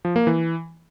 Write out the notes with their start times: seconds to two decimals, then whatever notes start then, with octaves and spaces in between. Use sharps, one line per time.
0.05 F3
0.16 A#3
0.27 E3